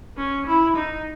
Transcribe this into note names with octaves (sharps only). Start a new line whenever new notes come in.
C#4
E4
D#4